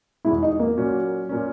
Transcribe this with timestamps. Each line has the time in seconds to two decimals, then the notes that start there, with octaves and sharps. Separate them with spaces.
0.25 E2 B2 G#3 E4
0.43 D#4
0.60 A#3
0.77 A#2 F#3 C#4 F#4
1.29 A#2 A#3 C#4